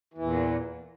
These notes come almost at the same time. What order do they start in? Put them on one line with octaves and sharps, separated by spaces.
E3 E2 A#2